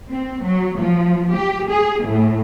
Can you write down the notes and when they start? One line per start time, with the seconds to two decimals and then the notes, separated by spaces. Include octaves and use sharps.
0.11 C4
0.44 F#3
0.79 F3
1.34 G4
1.69 G#4
2.05 A2